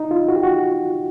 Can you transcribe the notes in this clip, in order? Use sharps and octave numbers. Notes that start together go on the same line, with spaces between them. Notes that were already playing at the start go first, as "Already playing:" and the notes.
Already playing: D#4
F4
F#4
G4
F#4